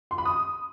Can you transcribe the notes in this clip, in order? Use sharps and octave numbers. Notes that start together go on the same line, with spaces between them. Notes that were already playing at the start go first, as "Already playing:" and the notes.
C6
B5
D#6